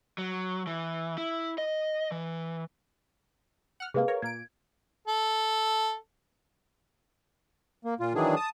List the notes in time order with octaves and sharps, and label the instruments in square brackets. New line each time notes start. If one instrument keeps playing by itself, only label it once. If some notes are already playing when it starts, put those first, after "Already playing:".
[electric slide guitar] F#3
E3
E4
D#5
E3
[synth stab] F#5 F6
[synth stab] C3 G#3 A#3 [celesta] G#4 B4 F5
[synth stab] A#4 C#5
[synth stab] A#2 A#3 D7 [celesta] G#6
[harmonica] A4
[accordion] A#3
A#2 F4
D#3 E3 F#3 D4 G#4
A5 D#6